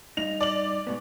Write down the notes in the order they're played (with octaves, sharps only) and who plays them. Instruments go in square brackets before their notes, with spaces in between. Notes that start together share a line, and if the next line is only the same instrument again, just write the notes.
[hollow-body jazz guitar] G2 D#4 [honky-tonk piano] F7
[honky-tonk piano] D5 F#7
[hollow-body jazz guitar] G#2 B2 B3